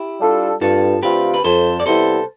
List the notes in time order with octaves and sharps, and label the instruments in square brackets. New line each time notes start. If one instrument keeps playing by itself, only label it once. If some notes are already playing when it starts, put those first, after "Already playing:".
Already playing: [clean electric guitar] E4 G4
[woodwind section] G3 D4 F4 A4
[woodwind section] G2 [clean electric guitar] F4 A4
[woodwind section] D3 A3 C4 F4 [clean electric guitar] G4 B4
[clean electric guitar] B4
[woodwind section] F2 [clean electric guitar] A4 C5
[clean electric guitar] D5
[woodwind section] C3 G3 B3 E4 [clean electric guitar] A4 C5